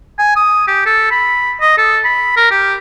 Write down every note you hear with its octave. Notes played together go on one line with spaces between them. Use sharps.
G#5
D#6
G4
A4
B5
D#5
A4
B5
A#4
G4